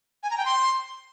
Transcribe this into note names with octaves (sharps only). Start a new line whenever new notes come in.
G#5
A#5
G5
C6